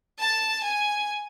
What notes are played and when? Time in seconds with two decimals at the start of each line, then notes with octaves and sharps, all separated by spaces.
0.19 A5
0.64 G#5